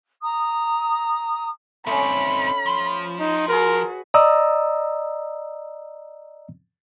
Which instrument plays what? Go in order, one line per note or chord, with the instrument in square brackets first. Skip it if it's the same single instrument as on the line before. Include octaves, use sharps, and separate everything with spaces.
[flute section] A#5 D#6
[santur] A3 C#4 [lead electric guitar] C4 D#4 [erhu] B5
[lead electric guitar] F3
[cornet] D#4
[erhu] F#4 [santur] G#4 B4 [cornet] A#4
[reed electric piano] D5 D#5 A#5 D#6 E6